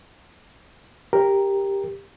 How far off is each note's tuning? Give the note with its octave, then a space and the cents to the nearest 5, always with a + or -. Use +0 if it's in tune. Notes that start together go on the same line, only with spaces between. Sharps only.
G4 +10 A#4 +0